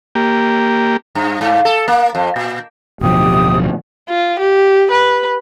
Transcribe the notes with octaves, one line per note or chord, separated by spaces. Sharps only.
A#3 G4
G2
G#2
A4
A#3
F2
A#2
D1 B2 F3 G4 D#6
F4
G4
B4